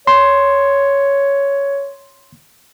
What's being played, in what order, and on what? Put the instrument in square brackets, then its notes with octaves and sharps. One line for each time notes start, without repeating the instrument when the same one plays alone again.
[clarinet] C#5 [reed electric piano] C6